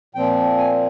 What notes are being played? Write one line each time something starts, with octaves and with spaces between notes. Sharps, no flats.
A#2 F3 C4 G5
G#5